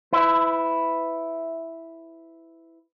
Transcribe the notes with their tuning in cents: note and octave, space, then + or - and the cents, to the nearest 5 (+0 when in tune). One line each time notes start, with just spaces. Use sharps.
E4 +0 B4 +30